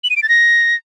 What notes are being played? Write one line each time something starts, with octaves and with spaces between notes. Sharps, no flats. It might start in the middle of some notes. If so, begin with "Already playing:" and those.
F#7
D#7
D7
A6
A#6